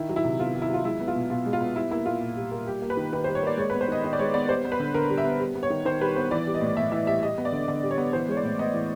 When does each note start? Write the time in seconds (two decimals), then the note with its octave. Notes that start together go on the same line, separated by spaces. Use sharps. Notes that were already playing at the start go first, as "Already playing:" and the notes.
Already playing: D#3 E4
0.09 F#3
0.16 E4
0.24 C3
0.39 B3 F4
0.54 D#3
0.62 E4
0.69 F#3 F4
0.85 G#3 E4
1.00 B3
1.08 F4
1.15 B2
1.30 B2 F4
1.46 G#3
1.53 F4
1.61 B3
1.75 G3 E4
1.91 A#3 E4
2.06 A#2 F4
2.21 A#2
2.36 G3
2.51 A#3
2.67 G3 G4
2.82 A#3
2.90 B4
2.97 D#3
3.12 D#3 B4
3.24 C5
3.28 G3
3.35 C#5
3.43 A#3 D5
3.58 G#3 C#5
3.70 B4
3.73 B3
3.81 C5
3.88 D#3 D#5
4.04 D#3 D#5
4.13 D5
4.19 G#3 C#5
4.34 B3 D5
4.49 G3 C5
4.65 B3
4.72 B4
4.80 D3
4.94 D3 A#4
5.10 G3
5.18 E5
5.25 B3
5.40 G3
5.55 B3
5.63 C#5
5.70 D#3
5.85 D#3 C5
6.01 G3 B4
6.16 B3 C5
6.31 E3 D5
6.47 G3
6.54 D#5
6.61 A2
6.77 A2 E5
6.92 E3 E5
7.07 G3 E5
7.22 G3 D#5
7.38 B3
7.45 D5
7.52 D3
7.68 D3 D5
7.83 G3
7.91 C#5
7.98 B3
8.13 E3 C5
8.28 G#3 C#5
8.37 D5
8.44 A2
8.59 B3 D#5
8.74 E3